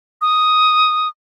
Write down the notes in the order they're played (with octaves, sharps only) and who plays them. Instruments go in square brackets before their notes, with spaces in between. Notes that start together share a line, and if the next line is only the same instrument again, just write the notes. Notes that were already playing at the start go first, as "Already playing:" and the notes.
[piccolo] D#6